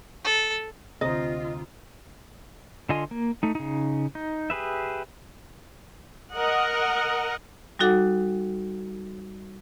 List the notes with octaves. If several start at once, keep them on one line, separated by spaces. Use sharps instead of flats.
A4
D2 C3 C4 F4 C5 D#5 A#5 D#6
D3 F4 D#5 G#5 C6
A#3
A3 D#4
C#3 D#4
D#4
G4 G#4 B4 E5
A#4 D#5 F#5
G3 D#4 F#4 A4 F#5 D6